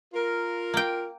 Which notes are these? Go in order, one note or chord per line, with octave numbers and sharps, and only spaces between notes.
F4 A#4
A#3 G5